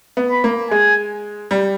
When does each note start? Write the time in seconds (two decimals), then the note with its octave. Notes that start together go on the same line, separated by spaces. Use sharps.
0.17 B3
0.31 B5
0.44 A#3
0.71 G#3 G#5
1.51 G3